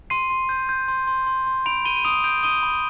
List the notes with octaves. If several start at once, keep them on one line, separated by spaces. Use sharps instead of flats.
C6 C7 D#7
C6
G6
G6
C6
C6
C6
C6
B5 D7 F7
B5 D#7 G7
D#7
D#6 D7 F7
G6 D7 F7
D#6 D#7 G7
B5